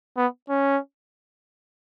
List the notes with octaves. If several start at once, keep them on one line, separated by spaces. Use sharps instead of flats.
B3
C#4